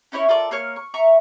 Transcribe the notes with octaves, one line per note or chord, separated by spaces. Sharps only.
C#4 D#4 E4 C#5
F4 A4 A#4 D5
A#3 A#4 C#5 F6
C#6
E5 A#5 C#6